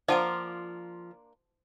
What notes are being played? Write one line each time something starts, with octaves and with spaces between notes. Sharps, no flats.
F3 A#3 D4 F4 C5 F#5 A#5